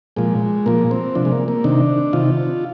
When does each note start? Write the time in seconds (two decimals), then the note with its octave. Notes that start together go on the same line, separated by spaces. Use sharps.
0.17 A#2 F3 G#3
0.66 A#2 F3 A#3
0.91 C4
1.15 C3 F3 D4
1.25 G#3
1.32 A#3
1.48 A#3
1.64 C3 D#3 D4
2.13 C3 D#3 F4